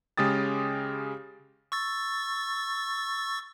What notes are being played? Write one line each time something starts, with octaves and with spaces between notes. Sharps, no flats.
C#3 G#3 G4 D#6 A6
C#6 E6 A6